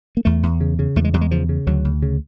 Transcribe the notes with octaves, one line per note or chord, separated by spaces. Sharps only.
A#3
E2 A3
E2
C#3
C#3
E2 A3
G#3
E2 G3
G#3
C#3 F3
C#3
D2 F#3
D2
C#3